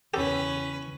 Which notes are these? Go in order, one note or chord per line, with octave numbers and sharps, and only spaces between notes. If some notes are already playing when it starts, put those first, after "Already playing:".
E2 C#3 C#4 G4 A4 B4